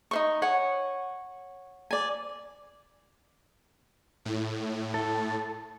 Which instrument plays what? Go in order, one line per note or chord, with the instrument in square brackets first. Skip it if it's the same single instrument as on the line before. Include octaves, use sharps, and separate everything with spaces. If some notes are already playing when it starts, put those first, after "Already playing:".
[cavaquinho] D#4 C5 C#6
C#5 F#5 G#5
D5 G#5
[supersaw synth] A2
[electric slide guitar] A4